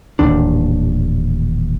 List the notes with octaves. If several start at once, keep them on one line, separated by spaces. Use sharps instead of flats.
D#1 A1 D#2 D4